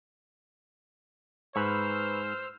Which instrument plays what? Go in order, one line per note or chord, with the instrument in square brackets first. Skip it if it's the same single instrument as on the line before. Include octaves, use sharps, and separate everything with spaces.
[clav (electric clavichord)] G#2 [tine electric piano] B4 B5 C#6 [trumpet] C5 [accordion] E6 F6